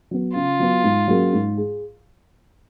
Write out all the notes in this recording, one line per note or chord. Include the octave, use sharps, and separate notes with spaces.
F#3 B3
C#3 F4
F#3 B3
G#2
F#3 A#3 C#4 G#4
G#2
G#4